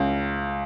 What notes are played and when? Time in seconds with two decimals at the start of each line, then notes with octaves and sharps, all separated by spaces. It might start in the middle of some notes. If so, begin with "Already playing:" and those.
Already playing: C#2